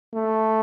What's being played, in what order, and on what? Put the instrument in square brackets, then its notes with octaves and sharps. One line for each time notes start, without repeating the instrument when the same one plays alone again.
[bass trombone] A3